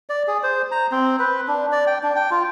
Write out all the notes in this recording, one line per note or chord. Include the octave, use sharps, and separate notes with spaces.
D5
G#4
C5
A#5
C4
B4
D4
D5
G5
D4
G5
F4